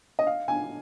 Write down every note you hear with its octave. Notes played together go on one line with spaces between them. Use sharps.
D#5
F5
G#5